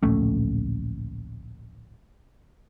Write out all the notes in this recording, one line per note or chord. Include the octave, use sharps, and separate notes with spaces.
D1 A#1 A3 C#4